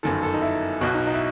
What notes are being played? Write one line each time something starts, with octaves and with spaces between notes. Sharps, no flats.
G1 F#2 D#3 A4
A4
D#4
E4
B1 B2 F#4
D#4
D#4
E4